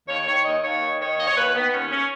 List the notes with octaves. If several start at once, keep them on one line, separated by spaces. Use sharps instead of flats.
D#2 C#5
D#3 C#5
D#2 D#5
D#2 C#5
D#3
D#3 C#5
D#2 D#5
C#5
D#2 B4
D#3 B3
D#2 C#4
C#4